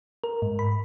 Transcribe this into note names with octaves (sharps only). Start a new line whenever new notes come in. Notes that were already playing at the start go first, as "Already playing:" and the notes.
A#4
G#2
B5